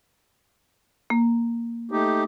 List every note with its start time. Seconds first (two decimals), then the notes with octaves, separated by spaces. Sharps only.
1.10 A#3
1.92 A3 D#4 G4